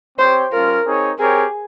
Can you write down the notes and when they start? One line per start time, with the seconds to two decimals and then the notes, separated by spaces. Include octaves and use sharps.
0.19 C4 G4 C5 C#5 G5
0.52 G3 C#4 F4 A#4
0.86 C4 D#4 G#4 C#5
1.19 C4 G4 G#4 A#4 C#5